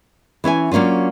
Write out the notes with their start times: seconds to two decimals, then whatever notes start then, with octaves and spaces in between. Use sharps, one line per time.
0.44 E3 C#4 E5 G#5
0.71 F#3 A#3 C#4 D4 F4